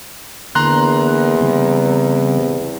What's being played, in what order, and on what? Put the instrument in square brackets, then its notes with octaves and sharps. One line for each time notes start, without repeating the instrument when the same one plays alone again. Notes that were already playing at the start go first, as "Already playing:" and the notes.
[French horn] E2 [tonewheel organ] D3 A#3 [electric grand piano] A#5 C6 F#6
[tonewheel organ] C#3 G3 C4